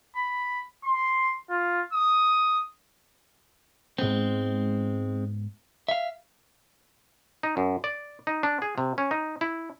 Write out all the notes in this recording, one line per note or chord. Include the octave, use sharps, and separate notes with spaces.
B5
C6
F4
D#6
G#2 G#3 B3 C4
E5 F5
D#4
F#2
D5
D#4
D4
G#4
C3
C#4
D#4
E4